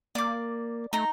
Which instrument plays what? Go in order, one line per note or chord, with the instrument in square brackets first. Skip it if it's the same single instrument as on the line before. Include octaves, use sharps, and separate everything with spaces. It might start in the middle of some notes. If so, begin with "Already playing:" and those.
[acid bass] A#3 [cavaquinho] D5 D6
[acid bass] A3 [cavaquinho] D#4 A#5